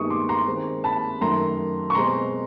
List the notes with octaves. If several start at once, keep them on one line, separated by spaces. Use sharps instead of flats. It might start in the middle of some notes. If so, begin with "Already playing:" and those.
Already playing: G2 D#3 G#3 B3 D#4 C#6 D#6
C6 D6
A#5 C6
D#3 G#3 C4
A5 B5
F#2 D#3 F#3 A3 A#5 C6
C#6
B2 G#3 C4 A#5 C6